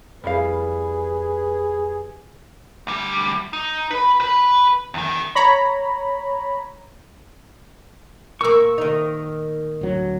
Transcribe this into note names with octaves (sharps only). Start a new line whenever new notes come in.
F2 G3 E4 G#4 B4 F5
D2 G3
D#4
B4 B5
B4 B5
E2 D#3
C#5 A#5 B5
A#2 A#3 C#6 E6
D#3 D#4
D1 F#3